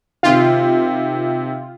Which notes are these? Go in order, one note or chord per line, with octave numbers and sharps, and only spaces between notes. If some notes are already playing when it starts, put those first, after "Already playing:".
C3 D#3 F4